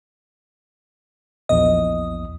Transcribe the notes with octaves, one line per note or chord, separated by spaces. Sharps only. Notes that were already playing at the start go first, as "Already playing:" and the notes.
A#1 E2 D#5 D#6